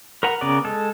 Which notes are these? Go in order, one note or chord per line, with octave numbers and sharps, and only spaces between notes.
A#4 B4 F#5 A#5
C#3 B3 A#4 D5
G#3 A4